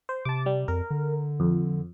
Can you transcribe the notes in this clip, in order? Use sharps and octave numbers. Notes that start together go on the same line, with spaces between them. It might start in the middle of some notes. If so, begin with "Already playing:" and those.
C5
C3 A5 D6
G3
F2 A#4
D3
F2